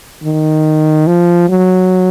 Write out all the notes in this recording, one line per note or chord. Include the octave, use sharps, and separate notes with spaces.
D#3
F3
F#3